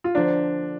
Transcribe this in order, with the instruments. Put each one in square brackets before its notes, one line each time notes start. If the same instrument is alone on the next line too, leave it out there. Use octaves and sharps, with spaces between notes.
[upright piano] F4
[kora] D3 F3 A#3 [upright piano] D4